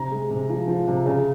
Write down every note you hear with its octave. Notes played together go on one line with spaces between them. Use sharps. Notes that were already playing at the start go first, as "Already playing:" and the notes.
Already playing: C3 A#5
G#3
C3
F3
F3
C3
C#3